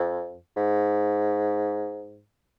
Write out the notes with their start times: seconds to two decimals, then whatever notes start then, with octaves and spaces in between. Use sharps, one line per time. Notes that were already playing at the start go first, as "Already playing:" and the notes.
Already playing: F2
0.56 G#2